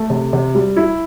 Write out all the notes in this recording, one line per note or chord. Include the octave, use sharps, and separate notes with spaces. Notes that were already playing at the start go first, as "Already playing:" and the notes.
Already playing: A3
C3
C3
G3
E4